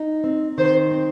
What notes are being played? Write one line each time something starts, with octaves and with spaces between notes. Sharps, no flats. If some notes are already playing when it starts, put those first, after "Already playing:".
Already playing: D#4
C4
D#3 C5
C4